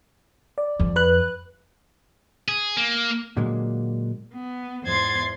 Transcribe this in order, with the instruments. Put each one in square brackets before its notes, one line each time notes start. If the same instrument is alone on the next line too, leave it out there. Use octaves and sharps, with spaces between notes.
[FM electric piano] D5
[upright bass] F2
[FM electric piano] B4 F#6
[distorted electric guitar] G#4
A#3
[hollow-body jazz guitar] A#2 D3 F#3 G#3 A#3
[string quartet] B3
E2 G#2 C5 C6 G#6 A6